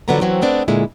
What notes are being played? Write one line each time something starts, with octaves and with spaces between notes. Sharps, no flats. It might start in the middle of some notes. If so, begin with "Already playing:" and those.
D3 F3 F#3 B3 D4 A#5
C3 E3 F#3 A3 C4 C#4
A3 B3 C4 D4
A#2 D3 G#3 E4